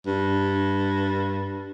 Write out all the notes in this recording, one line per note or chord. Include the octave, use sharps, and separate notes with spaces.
G2